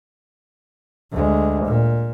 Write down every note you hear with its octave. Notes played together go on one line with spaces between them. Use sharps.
D2 G#3
A#2